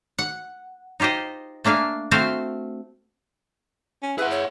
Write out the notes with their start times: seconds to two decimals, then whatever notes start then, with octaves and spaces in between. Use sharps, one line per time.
0.19 F#5
1.00 D#4 F4 G4 C5 D#5
1.64 A3 A#3 D4 F5 G#5
2.11 A3 C4 F#4 C5 F5
4.03 C#4
4.18 E4 G#4 B4 F#5
4.31 C#5